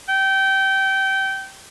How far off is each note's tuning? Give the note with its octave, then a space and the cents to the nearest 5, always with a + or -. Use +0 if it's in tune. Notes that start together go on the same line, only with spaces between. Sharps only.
G5 -20